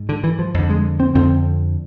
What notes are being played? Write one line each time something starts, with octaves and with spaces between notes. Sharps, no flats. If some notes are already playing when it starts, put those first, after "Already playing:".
Already playing: G#2
D3
E3
F3
F2 D3
G#3
C4
F2 D3 C4